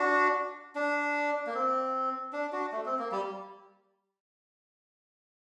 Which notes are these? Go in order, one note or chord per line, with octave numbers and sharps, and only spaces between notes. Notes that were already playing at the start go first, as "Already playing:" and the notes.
Already playing: D4 F#4
D4
A#3
C4
D4
D4 F#4
A3
C4
A#3
G3